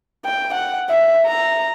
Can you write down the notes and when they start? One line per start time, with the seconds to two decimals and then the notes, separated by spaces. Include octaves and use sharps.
0.25 G5
0.54 F#5
0.89 E5
1.26 A#5